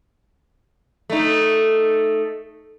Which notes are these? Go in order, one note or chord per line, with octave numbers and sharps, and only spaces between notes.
A3 D#4